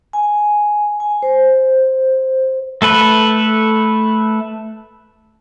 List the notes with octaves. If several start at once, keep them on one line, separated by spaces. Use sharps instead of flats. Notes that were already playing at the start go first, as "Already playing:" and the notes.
G#5
G#5
C5
A3 A4 B4